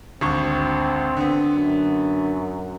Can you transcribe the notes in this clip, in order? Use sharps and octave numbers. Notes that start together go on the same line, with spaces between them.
G#1 D2 C4 C#6
D3 B3
F#2